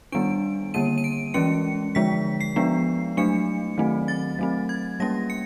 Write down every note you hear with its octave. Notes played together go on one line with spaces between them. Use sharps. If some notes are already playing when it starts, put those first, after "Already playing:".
D#3 G3 B3 D4 D7
D3 G3 A#3 D#7
D#7
D7
E3 G#3 C#4 C#7
D3 F3 G#3 B6
C7
F3 G#3 B3 D4
F#3 A3 D4 C#7
D#3 F#3 A3 C4
A6
F#3 A3 C4
G#6
G3 A#3 C#4 A#6
C#7